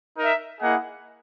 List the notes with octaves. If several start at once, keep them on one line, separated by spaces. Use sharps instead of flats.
D#4 A#4 E5
A#3 E4 G#4 D#5 F#5